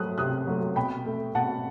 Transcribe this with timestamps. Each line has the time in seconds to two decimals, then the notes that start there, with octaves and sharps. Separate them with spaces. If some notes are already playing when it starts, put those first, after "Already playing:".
Already playing: F#3 A3 D#6 F#6
0.18 C3 D#6 F#6
0.47 F#3 A3
0.76 B2 G5 B5
1.06 A3
1.35 B2 F#5 A5